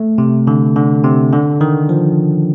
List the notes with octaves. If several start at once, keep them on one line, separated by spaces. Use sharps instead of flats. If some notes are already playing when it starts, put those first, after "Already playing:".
Already playing: A3
C3
D3
D3
C3
D3
D#3
F3